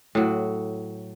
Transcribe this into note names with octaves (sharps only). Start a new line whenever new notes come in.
A2 F#3